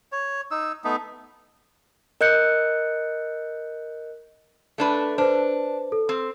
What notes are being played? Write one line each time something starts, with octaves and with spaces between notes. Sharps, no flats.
C#5
D#4 E6
A3 B3 D#4
A#4 D#5 F#6 G6 C#7
A3 D4 B4
D4 B4 C5
A4
C4